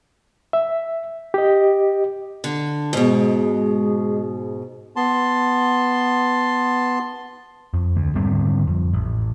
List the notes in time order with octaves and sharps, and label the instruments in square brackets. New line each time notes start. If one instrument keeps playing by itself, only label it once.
[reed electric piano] E5
G4 D#5
[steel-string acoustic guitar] D3
[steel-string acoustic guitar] G#2 B2 [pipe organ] G#3 G#4
[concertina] B3 A5 C6
[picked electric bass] F2
D2
G#2 D3 G3 C4
F2
A1